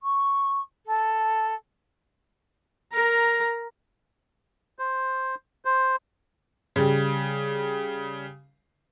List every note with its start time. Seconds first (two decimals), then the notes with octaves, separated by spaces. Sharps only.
0.02 C#6
0.86 A4
2.93 A#4 A#5
4.79 C5
5.65 C5
6.76 C#3 G3